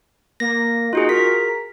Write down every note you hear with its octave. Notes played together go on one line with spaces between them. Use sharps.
A#3 A#6
D#4 F4 F#4 G#4
A#4 B6